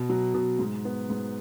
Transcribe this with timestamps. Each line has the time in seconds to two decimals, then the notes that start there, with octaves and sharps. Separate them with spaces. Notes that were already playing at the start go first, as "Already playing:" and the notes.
Already playing: B2
0.09 F#3
0.34 B2
0.59 G#2
0.85 B3
1.10 G#2